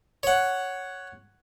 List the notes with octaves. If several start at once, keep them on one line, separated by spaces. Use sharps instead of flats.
C#5 F#5